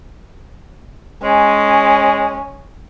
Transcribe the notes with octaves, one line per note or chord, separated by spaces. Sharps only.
G#3 C#4